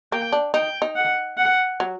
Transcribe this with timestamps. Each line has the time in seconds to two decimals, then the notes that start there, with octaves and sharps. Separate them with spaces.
0.12 A#3 G5
0.33 D4
0.54 D#4 G5
0.82 D#4
0.96 F#5
1.38 F#5
1.80 F#3